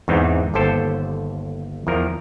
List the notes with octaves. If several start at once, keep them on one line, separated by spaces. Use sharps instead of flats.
E2 G#2 E3 C4 D#4
G1 D#2 G4 A4 C5 A5
E2 F3 A#4